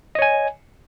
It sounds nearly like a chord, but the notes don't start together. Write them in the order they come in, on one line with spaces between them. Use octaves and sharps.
D#5 C#5 G#5